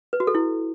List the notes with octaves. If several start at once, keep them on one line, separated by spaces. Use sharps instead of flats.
B4
F#4
A4
E4